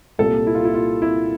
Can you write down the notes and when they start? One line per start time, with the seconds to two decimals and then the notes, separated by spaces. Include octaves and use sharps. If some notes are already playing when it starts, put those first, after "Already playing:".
0.18 C2 A#2 G3 A#3 A4
0.47 E4
0.55 F4
0.65 E4
0.74 F4
1.02 E4